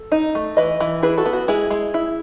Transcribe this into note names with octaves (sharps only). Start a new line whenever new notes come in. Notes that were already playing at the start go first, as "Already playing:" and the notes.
Already playing: A4
D#4
A3
E3 B4 D#5
E3
E4 G#4 B4
F#4 A4
B3
F#4
G#3 E4 G#4
G#3
E4